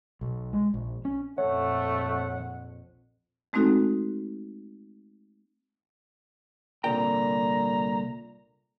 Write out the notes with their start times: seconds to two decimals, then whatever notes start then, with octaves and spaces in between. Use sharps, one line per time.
0.21 B1
0.53 G#3
0.74 A#1
1.05 C#4
1.38 A#1 F2 A3 C#5 F#5
3.53 G#3 A3 C4 D#4 F#4 A4
6.84 C2 A#2 D3 G5 A#5